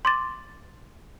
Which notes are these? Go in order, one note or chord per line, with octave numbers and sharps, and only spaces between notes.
C6 D6 A6